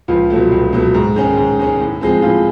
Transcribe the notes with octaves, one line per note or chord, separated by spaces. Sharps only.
C#2 F3 F4
B2 F#3 A3
C#2
B2 F#3 A3
G#2
D#3 G#3 C#4
G#2
D#3 G#3 C#4
A2
F3 G#3 C4
A2 F3 F4